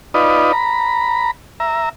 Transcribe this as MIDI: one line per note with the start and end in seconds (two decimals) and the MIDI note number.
0.14 0.52 63
0.14 0.52 65
0.14 0.52 71
0.14 0.52 74
0.14 0.52 75
0.53 1.31 82
0.53 1.31 83
1.60 1.89 76
1.60 1.89 82